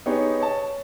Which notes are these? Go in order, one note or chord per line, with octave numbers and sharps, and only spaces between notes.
B3 D#4 G4 G#4 C#5
C#5 A5